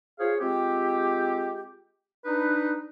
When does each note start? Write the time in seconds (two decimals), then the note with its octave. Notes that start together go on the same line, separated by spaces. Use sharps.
0.19 F4 G#4 C5 C#5 F5
0.40 G#3 C4 F4 G4
2.25 D4 D#4 B4